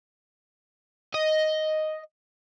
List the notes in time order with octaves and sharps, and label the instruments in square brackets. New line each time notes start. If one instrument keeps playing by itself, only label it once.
[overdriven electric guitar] D#5